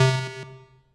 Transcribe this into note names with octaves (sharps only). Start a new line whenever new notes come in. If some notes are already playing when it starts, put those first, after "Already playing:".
Already playing: C3